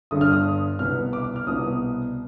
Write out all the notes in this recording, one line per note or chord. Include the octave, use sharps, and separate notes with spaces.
G1 G2 D3 D#6
F6
D#6
C2 B2 B3 F6
D6
F6
C2 B2 B3 D#6